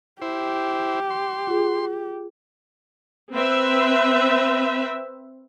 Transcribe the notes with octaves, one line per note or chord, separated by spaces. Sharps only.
E4 G4 C5
C6
F4 G#4
C4 B4 E5